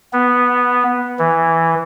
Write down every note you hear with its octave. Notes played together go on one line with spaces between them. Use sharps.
B3
E3